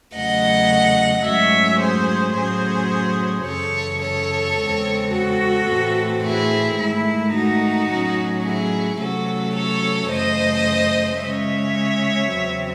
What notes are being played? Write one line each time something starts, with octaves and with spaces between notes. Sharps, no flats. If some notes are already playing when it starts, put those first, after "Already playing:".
E2 C#3 F#3 A3 D#5 F#5
G#2 F#3 A3 C#4 C#5 E5
G#4 C5
A2 F#3 C#4 G#4 C5
F#2 C#3 E3 A4 C#5
A4 C#5
E2 C#3 G#3 C4
F#4 A4
A2 E3 A3 C4
E4 G#4
G#2 D#3 A3 E4
D#4 F#4
A2 F#3 C#4
E4 G#4
C3 F#3 A3 C#4 F#4 A4
A4 C#5
F#2 C#3 E3 A3 C5 D#5
C#3 G#3 C#4 C#5 E5
E2 C#3 F#3 C4